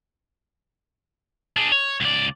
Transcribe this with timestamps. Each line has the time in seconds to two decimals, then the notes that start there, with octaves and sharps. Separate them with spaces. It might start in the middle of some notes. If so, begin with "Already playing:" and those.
1.57 D4 G#4
1.72 C#5
2.01 C#2 D5